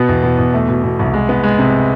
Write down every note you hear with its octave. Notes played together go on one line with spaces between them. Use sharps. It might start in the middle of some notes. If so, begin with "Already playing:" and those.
Already playing: B2 B3
E2
B2
E2
A3
B2
B2
C2
G#3
B3
G#3
C3